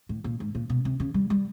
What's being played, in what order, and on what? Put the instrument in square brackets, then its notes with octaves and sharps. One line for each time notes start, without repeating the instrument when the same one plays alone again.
[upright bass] A2
A#2
G#2
A#2
B2
C3
C#3
G3
G3